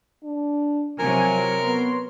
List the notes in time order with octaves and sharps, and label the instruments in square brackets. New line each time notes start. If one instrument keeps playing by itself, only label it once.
[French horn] D4
[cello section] C3 F#3 [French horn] F3 [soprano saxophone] A#4 [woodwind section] G#5
[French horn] B3 [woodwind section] F#4 C#5 C6